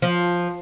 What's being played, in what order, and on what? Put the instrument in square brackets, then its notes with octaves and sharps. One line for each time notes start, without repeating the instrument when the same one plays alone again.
[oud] F3